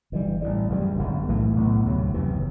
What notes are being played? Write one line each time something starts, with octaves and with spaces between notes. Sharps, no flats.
G1 G2 E3 G3
A1 A2 G3
F#1 E2 C3 G3
G1 F#2 D3
B1 A2 E3 A3
B1 A2 G3 B3
D2 C3 F#3
F#1 E2 C3 E3